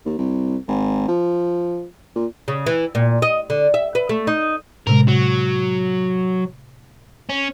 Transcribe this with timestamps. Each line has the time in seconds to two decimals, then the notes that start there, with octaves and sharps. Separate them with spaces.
0.06 D#2
0.18 C2
0.68 G#1
1.08 F3
2.16 A#2
2.48 C#3
2.66 E3
2.95 A#2
3.22 D#5
3.50 D3
3.74 E5
3.95 B4
4.09 A3
4.27 D#4
4.87 A2 C3 G#3 A#4
5.08 F#3
7.29 C#4